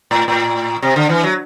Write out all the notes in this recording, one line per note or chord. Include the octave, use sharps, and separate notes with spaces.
A2
A2
C3
D3
E3
F#3